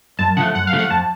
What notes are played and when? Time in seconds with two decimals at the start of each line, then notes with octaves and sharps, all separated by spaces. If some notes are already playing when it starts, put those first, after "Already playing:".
0.19 F#2 A5
0.37 C#3 F3 A3 F#5
0.55 F#2 F#5
0.67 F5
0.73 C#3 F3 A3
0.79 F#5
0.90 F2 A5